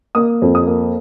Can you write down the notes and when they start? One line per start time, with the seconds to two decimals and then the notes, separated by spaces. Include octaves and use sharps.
0.15 A#3 D#6
0.42 F2
0.55 D#6
0.67 A#3